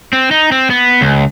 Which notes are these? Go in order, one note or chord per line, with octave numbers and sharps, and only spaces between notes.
C4
D#4
C4
B3
C#2